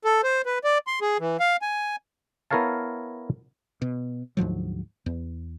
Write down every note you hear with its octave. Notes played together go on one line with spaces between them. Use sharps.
A4
C5
B4
D5
C6
G#4
E3
F5
G#5
B3 E4 A#4 C#5 F5 A5
B2
D2 G#2 F3 F#3
E2